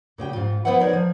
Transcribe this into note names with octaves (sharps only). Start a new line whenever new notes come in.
A#2 C#3 G4 G5
G#2 F4
B3 E4 B4 C5 E5 F#5
D#4 A#4 C#5 D5
F3